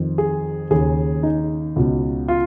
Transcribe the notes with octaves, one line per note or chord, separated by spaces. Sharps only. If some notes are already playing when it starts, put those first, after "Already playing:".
Already playing: F2 D#3
G#4
D#2 C#3 G#4
D#4
C#2 B2
F4